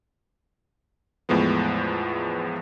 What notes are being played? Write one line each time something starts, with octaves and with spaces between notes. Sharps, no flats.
E2 A2 F3 G#3 B3